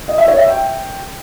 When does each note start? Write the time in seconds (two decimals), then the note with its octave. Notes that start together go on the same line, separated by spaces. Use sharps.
0.08 D#5
0.18 E5
0.28 C#5
0.38 E5
0.48 G5